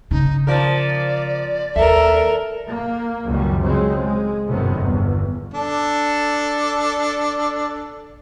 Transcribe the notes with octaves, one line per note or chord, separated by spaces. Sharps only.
C#3 D#4
F3 A#3 A#4 D5
D#2 A4 A#4 E5
A#3
C#2 F#2 D#3 F#3 G3
C#3 F#3 G#3 C4
G#3
G1 F#2 A2 C3 D#3 B3
G1 E2
D4 A4